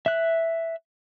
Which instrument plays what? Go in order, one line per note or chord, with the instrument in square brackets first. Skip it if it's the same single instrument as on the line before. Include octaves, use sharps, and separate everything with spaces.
[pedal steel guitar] E5 F#6